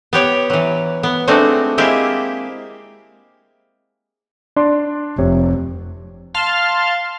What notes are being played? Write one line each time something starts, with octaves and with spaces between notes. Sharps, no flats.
B3 G4 C#5 G5
E3 F#3
B3
G#3 A3 C4 D4 D#4 F#4
G#3 A#3 C4 E4 G4 G#4
D4 D5 C6
F1 C3 C#5
F5 A5 C6 F6